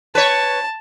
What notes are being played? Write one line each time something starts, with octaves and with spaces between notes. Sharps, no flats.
B4 C#5 A5